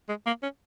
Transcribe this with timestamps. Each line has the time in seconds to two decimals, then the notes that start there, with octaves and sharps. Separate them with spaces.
0.09 G#3
0.26 A#3
0.43 C#4